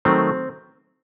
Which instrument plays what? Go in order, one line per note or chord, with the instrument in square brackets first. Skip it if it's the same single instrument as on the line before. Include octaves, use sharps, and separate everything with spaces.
[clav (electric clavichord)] D#3 F#3 A3 C4